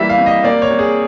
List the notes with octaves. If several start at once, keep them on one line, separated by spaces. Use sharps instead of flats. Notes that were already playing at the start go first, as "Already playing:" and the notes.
Already playing: E3 G3 A#3 E5
F5
C3
D#5
A#3 D5
C#5
C3
G#4